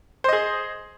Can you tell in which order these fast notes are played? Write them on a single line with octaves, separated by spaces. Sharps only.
C5 D#5 G#4